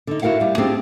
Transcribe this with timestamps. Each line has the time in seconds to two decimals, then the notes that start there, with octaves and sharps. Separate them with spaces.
0.07 D3 D#4
0.22 E4 F#4 A#4 F5 F#5
0.40 G3 F5
0.58 C4 D4 F4 G4 G#4 C5